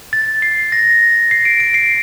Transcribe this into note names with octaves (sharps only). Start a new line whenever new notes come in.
A6
C7
A#6
C7
D7
D7
C7